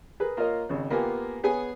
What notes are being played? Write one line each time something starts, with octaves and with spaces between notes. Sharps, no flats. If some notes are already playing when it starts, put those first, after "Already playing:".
G#4 A#4 B4
A#3 F4 A#4 C#5 D#5
G#1 C#3
A#3 B3 F4 G4 G#5
B3 G#4 C#5 G#5